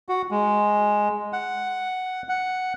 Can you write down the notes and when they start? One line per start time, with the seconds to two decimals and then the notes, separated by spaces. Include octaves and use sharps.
0.09 F#4
0.31 G#3
1.33 F#5
2.29 F#5